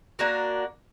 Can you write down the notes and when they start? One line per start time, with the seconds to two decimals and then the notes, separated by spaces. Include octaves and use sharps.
0.19 A#3 D4 F#4 A#4